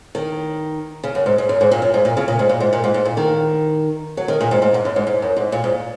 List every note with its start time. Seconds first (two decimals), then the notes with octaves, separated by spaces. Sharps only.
0.15 D#3
1.03 C#3
1.15 F#2
1.26 G#2
1.38 G#2
1.49 F#2
1.61 G#2
1.71 A#2
1.82 F#2
1.94 G#2
2.05 A#2
2.17 C#3
2.28 A#2
2.39 G#2
2.49 A#2
2.60 G#2
2.73 A#2
2.84 G#2
2.94 G#2
3.05 A#2
3.17 D#3
4.17 F#3
4.28 D#3
4.40 A#2
4.51 G#2
4.62 G#2
4.74 G#2
4.85 F#2
4.96 G#2
5.07 G#2
5.22 F#2
5.37 G#2
5.52 A#2
5.64 G#2